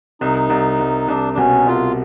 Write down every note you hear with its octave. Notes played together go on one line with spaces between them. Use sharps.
C2 D#4
C2
C2
C2 D4
D4
B2 C#4
C2 F4